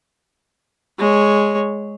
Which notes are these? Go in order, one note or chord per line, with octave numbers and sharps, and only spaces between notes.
G#3 C#5